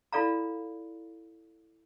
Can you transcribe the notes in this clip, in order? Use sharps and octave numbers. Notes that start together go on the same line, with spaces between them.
E4 F4 A4 D5 F5 A#5